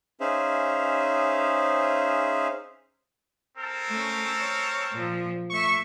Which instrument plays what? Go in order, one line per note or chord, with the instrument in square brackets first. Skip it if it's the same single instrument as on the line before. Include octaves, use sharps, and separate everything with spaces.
[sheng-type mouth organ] C#4 D#4 G#4 C5 E5 F5
[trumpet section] C4 A4 A#4
[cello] A3 C#4
C#5
A#2 F3
[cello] A3 E5 [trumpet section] C#6